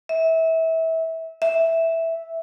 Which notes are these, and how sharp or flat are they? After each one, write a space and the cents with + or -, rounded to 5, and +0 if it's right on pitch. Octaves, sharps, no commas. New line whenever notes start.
E5 -25
E5 -5